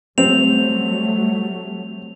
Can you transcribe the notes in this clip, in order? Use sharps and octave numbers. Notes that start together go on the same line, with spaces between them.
F#3 G3 A3 C4 F7